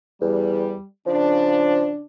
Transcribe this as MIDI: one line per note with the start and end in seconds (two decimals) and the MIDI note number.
0.21 0.75 40
0.21 0.84 55
1.07 2.04 49
1.07 1.88 53
1.07 2.04 62